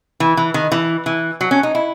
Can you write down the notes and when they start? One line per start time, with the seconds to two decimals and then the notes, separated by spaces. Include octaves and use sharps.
0.20 E3
0.37 E3
0.54 D#3
0.72 E3
1.06 E3
1.41 F#3
1.51 C#4
1.63 D#4
1.75 E4